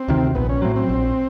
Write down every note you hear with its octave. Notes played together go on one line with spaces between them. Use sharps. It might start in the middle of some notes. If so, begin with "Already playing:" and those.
Already playing: C4
D2 C3 D#3
A#1 B3
C#4
A2 F#3 C4
C4
A#1